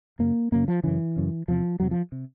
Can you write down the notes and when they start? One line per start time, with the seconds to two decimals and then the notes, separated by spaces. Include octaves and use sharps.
0.19 F#2 C#3 A#3
0.52 F#2 C#3 A#3
0.68 F3
0.83 F#2 C#3 E3
1.16 F#2 C#3
1.48 E2 C3 F3
1.80 E2 C3 F#3
1.91 F3
2.12 C3